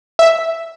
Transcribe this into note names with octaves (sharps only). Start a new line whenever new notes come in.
E5